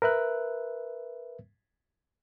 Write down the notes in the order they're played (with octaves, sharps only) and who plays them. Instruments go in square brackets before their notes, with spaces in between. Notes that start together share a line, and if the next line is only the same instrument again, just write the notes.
[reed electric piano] A#4 B4 E5 F#6